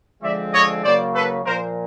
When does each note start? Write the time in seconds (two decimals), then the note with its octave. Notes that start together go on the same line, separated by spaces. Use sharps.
0.22 D3 F3 G#3 C4 D5 E5
0.53 C#5 D#5
0.83 C#3 F#3 A#3 C5 D5
1.14 A4 B4
1.45 A#2 F3 A#3 A#4 C5